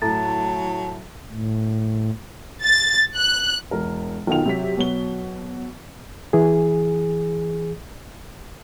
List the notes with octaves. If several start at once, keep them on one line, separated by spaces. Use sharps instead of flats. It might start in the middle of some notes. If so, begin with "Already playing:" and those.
A2 F#3 A4 A5 A#5 A6
A2
A6
F#6
E1 A#4
B1 B2 D#3 F4 F7
C3 F#3 B6
B2 F#3 G7
E3 G#4